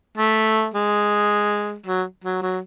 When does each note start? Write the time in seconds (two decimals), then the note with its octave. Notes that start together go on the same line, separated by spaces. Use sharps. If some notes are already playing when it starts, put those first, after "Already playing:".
0.18 A3
0.74 G#3
1.86 F#3
2.24 F#3
2.42 F#3